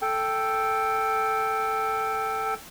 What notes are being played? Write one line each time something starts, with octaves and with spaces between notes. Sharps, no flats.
A4 G5